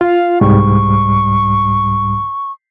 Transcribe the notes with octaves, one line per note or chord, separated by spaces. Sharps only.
F4 F5
C2 G#2 G3 C#6